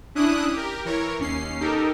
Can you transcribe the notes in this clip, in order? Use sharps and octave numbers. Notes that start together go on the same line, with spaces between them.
C#4 D4 E4 D#6 F#6
G4 A#4
E3 A#4 C#5
D#2 C#4 C7
D#4 G4 A4 A#4